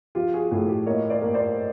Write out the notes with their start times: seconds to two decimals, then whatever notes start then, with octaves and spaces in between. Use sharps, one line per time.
0.15 F3 F4 G4
0.33 F#4 G#4
0.51 A2 F#4 G#4
0.68 G4 A4
0.86 A#3 C#5 D#5
1.10 C5 D5
1.22 A#3
1.34 C5 D5